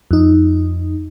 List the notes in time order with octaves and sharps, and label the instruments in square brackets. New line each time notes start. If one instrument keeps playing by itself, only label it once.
[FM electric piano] F2 D#4